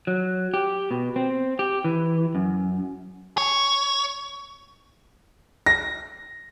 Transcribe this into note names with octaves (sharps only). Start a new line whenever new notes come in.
F#3
G4
B2
C4
G4
E3
F#2
C#5
A#6